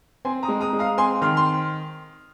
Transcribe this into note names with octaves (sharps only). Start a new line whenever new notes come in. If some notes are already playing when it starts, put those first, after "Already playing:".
C4 G#5 C6
A#5 D#6
G#3
A#5 D#6
G#3
F5 A#5
C4 G#5 C6
D#3 C6 F6
C6